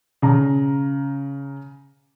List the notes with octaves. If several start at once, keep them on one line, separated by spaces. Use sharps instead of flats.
C#3 A#5